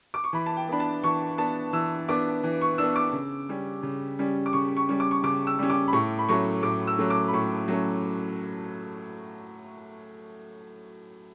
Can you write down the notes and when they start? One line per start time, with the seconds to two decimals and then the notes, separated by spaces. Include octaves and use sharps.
0.14 D6
0.24 C#6
0.33 E3 B5
0.46 A5
0.56 G5
0.68 B3 D4 B5
0.80 A5
1.04 E3 C#6
1.38 B3 D4 A5
1.73 E3 E6
2.08 B3 D4 D6
2.43 E3
2.61 C#6
2.78 B3 D4 E6
2.96 D6
3.13 C#3
3.49 G3 C#4
3.83 C#3
4.19 G3 C#4
4.46 D6
4.53 C#3 C#6
4.77 C#6
4.89 G3 C#4
5.00 D6
5.11 C#6
5.23 C#3 D6
5.47 E6
5.59 G3 C#4
5.70 D6
5.88 B5
5.93 A2 C#6
6.18 B5
6.29 F#3 A3 C#4 C#6
6.63 A2 D6
6.87 E6
6.98 F#3 A3 C#4
7.10 D6
7.28 B5
7.33 A2 C#6
7.68 F#3 A3 C#4